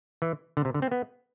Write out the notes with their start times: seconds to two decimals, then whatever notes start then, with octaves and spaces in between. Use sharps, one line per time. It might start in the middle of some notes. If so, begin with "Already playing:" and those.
0.22 E3
0.57 D3
0.65 C3
0.74 D3
0.82 C4
0.91 B3